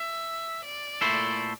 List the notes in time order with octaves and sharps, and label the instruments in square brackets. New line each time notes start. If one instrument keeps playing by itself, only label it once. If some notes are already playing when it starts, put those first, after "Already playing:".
Already playing: [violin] E5
D5
[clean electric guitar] A#2 A3 E4 A4 C5